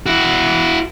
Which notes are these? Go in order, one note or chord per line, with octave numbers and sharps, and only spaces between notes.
E4 F#4